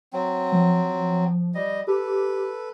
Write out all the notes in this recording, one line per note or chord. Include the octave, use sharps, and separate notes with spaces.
F#3 C4
F3
G3 D#5
G4 A4 B4